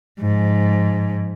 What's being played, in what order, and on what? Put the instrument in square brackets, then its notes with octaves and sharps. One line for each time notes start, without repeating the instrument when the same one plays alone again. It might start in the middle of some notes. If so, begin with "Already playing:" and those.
[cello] G#2 F3